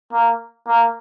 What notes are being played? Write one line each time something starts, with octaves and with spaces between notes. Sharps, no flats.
A#3
A#3